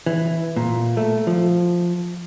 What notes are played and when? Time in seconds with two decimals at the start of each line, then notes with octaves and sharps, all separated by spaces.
0.06 E3
0.56 A#2
0.97 A3
1.27 F3